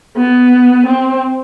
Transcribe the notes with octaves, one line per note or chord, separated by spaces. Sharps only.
B3
C4